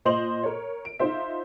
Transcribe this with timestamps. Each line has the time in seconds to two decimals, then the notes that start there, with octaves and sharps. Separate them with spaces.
0.05 A#2 C5 D#5 C6 F7 F#7
0.44 A#4 C#5
0.85 D7
0.99 D#4 F4 C5 E5